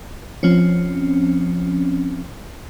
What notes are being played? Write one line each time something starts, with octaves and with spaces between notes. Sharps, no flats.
F3 C4 C#4